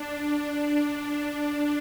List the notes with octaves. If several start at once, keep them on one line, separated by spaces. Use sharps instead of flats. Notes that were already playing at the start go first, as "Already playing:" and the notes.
Already playing: D4
D4